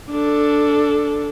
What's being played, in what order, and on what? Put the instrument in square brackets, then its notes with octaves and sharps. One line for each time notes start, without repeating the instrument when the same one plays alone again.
[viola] D4 A4